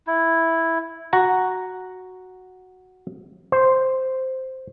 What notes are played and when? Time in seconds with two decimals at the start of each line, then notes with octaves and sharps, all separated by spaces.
0.07 E4
1.13 F#4 F#5 A#5
3.52 C5